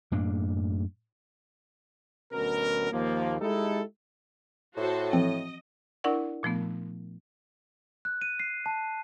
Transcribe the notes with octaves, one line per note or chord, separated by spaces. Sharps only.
F#2 A2 A#3 D4
D2 B2 F#3 C#4 A#4
D#2 F3 A#3
G#3 D#4 E4 G4 A4
A2 F#4 A4 C5
E3 F3 C4 D#5
D4 E4 A#4 D5 F#5 C#6
A#2 F3 A3 B3
F#6
D#7
C7
A5